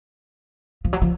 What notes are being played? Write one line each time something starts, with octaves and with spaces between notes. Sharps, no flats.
F3
F#3
F3